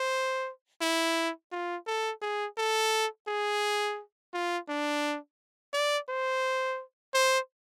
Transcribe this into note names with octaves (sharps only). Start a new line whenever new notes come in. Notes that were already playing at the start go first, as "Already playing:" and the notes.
Already playing: C5
E4
F4
A4
G#4
A4
G#4
F4
D4
D5
C5
C5